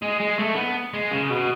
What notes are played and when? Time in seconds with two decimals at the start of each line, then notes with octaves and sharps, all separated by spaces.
0.02 G#3
0.20 G#3
0.39 A3
0.56 B3
0.94 G#3
1.11 C#3
1.30 B2